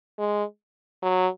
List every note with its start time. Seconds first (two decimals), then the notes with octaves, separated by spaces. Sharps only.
0.19 G#3
1.03 F#3